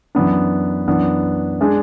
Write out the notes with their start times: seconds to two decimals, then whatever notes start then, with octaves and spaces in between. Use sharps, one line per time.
0.15 F#2 E3 B3 D4
0.88 F#2 E3 B3 D4
1.61 G#3 D4 G#4